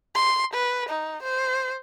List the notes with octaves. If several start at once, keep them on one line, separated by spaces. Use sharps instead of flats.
C6
B4
D#4
C5